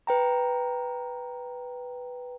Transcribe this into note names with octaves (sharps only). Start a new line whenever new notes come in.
B4 G5 A#5